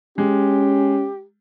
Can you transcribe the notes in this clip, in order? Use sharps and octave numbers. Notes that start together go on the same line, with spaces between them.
G#3 C#4 G4